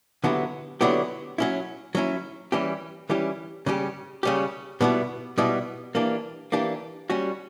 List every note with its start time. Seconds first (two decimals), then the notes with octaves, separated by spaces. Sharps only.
0.24 D3 F#3 B3 E4 G4
0.81 D3 F#3 B3 E4 G4
1.38 F#3 C#4 E4
1.95 F#3 C#4 E4
2.52 E3 G3 C#4 E4 G4
3.09 E3 G3 C#4 E4 G4
3.66 C#3 G3 C#4 G4
4.23 C#3 G3 C#4 G4
4.81 B2 G3 B3 E4
5.38 B2 G3 B3 E4
5.95 E3 A#3 D4 G4
6.52 E3 A#3 D4 G4
7.10 G3 C#4 F#4